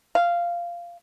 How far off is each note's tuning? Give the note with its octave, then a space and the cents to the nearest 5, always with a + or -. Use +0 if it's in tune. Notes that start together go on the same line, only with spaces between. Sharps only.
F5 -10